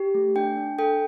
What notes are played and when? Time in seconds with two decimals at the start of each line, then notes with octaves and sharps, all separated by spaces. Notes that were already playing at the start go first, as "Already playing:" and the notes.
Already playing: G4
0.15 A3
0.36 D4 G5
0.57 D4
0.79 A4 G5